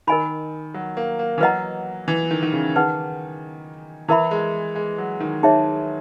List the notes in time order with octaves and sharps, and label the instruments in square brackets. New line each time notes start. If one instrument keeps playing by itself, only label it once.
[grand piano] D#3 [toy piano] A#4 D#5 G#5 B5
[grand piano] F#3
A#3
A#3
E3
[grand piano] F#3 [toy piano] B4 D#5 F#5 A#5
[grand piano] E3
D#3
D#3
C#3
[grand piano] D#3 [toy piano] D#4 G#4 B4 F#5
[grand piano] E3 [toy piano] E4 A#4 E5 B5
[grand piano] G#3
G#3
F#3
D#3
[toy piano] D#4 G#4 C#5 E5